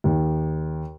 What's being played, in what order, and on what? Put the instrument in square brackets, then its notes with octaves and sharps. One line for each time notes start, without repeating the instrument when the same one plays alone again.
[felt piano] D#2